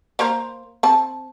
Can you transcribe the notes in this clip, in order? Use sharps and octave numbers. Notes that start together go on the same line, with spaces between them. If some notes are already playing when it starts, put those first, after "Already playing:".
A#3 A#4 C5
C4 A5